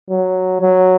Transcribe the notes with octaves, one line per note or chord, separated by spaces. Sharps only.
F#3
F#3